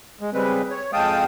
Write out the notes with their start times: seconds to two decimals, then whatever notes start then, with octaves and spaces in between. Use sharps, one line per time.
0.21 G#3
0.33 C#3 G3 G#3 C4 B4
0.71 C#5
0.93 F2 G#3 F5 G5 A5 D#6